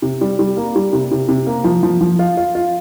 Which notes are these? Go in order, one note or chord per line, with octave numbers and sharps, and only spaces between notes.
C3
G3
G3
A#3
G3
C3
C3
C3
A#3
F3
F3
F3
F4
F4
F4